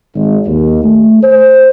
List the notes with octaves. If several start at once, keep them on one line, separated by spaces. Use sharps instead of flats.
G#1
D#2
A3
C5